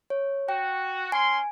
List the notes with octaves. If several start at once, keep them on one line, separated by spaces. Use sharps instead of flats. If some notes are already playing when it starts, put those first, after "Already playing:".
C#5
F#4 G5
C#4 G#5 C6